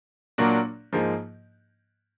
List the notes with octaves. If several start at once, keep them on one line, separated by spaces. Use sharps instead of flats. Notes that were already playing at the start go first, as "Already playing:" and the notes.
A#2 F#3 A#3 D4 F#4
G#2 F3 A#3 D#4 G#4